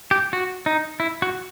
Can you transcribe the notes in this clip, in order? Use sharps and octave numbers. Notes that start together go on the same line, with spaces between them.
G4
F#4
D#4
E4
F#4